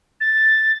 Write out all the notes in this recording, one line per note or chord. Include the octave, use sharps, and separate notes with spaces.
A6